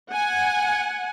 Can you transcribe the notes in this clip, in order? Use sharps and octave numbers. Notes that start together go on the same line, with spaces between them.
F#5 G#5